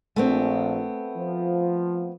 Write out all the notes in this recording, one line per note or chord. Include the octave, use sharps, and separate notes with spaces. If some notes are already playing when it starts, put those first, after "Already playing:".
A#1 A3 B3 C4
F3